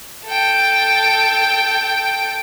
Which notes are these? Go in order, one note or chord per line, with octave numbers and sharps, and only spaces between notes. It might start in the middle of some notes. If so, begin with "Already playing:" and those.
A4 G5